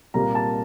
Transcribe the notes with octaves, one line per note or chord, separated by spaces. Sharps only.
C2 A#2 G3 A#3 A#5
A5